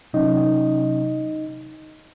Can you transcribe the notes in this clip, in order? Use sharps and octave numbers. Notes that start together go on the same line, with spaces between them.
C3 F#3 C#4 D#4 D#5